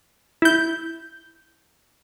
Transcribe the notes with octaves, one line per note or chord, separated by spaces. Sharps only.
E4 G6